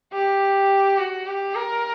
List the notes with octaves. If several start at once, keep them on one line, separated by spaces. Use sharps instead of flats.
G4
F#4
G4
A#4